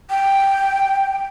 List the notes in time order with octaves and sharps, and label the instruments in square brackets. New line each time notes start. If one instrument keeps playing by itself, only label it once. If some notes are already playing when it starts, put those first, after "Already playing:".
[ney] G5